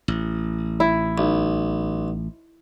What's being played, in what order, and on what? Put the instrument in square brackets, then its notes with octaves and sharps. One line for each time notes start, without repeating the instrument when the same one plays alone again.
[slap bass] A1
[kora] E4
[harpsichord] B1